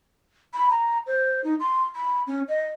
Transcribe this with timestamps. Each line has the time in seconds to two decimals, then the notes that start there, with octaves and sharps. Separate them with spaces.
0.54 B5
0.70 A#5
1.07 C5
1.44 D#4
1.60 C6
1.95 B5
2.27 C#4
2.48 D#5